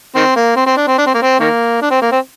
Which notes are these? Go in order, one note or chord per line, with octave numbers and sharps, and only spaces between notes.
D#3 C4
A#3
C4
C4
D4
C4
D4
C4
A#3
C4
D#3 A#3
D4
C4
A#3
C4